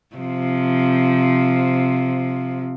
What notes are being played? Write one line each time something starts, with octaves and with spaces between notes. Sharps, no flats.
C3 F3